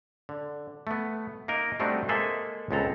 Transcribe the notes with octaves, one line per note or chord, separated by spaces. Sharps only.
D3
A3 B3
A#3 D#4 A#4 D#5
G3 A3 C4 D4 D#4 F#4
G#3 A#3 G#4 A4 C5 E5
C#2 B3 C4 A4 A#5